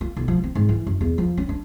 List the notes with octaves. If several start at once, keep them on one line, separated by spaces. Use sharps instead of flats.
F4
B1
F3
C4
G#2
E3
F#2
E2
F3
C#4
D4